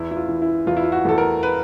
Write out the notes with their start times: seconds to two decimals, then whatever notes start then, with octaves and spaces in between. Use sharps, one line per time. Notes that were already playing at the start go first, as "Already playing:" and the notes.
Already playing: E2 E4
0.11 E4
0.16 F4
0.29 E3
0.42 E4
0.67 E2 F4
0.77 E4
0.84 F4
0.92 F#4
1.05 E2 A4
1.18 A#4
1.43 B4